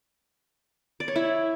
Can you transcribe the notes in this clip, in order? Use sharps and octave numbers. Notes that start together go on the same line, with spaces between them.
D5
C#5
E4